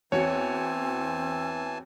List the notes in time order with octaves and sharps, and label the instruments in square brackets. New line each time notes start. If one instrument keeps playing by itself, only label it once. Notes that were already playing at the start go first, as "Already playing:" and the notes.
[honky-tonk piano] E2 F#4 C#7 [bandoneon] E3 G#5 A5 [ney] C4 [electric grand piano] C#5